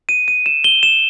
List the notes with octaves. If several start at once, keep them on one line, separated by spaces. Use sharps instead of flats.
D#7
D#7
E7
G7
E7